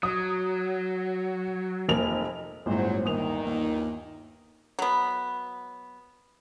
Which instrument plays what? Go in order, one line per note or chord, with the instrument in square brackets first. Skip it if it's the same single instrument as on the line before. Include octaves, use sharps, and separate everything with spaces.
[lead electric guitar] F#3 [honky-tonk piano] D#6
[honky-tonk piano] F1 A#3 F7
[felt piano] G1 [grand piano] A2 G#3 [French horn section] F#3 C5
[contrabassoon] D#2 [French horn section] D#3 [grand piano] G#5 D#6 F7
[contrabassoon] D#2
[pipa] F#3 B3